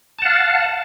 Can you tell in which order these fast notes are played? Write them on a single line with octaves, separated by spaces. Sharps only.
A5 F#5 F5